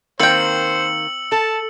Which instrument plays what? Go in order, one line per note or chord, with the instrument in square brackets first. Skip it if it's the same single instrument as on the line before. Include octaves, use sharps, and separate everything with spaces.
[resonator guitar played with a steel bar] D#3 A#3 [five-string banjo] C4 G5 [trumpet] C5 [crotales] E6 C#7 F#7
[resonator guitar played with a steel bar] A4 [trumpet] A5